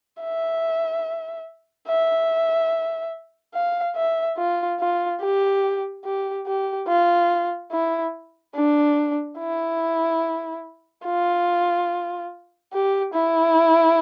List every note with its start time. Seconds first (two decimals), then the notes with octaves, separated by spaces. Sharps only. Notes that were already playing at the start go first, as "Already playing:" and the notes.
0.21 E5
1.88 E5
3.54 F5
3.96 E5
4.37 F4
4.79 F4
5.21 G4
6.04 G4
6.46 G4
6.88 F4
7.72 E4
8.55 D4
9.38 E4
11.05 F4
12.73 G4
13.14 E4